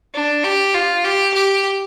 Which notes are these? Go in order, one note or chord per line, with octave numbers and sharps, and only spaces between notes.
D4
G4
F4
G4
G4